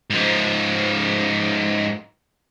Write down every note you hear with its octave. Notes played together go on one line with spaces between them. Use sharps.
G#2 F3